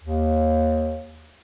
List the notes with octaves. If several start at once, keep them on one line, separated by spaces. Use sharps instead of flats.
D#2